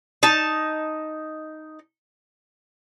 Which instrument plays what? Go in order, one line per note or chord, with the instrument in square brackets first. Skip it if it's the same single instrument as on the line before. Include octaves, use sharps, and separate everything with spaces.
[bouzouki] D#4 A5